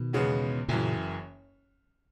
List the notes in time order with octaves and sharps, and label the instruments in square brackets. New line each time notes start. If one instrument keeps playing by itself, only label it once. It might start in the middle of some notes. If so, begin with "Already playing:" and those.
Already playing: [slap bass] B2 D#3
[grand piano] E2 C#3 G#3 B3
[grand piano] F#1 F#2 E3 [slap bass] A#2 C#3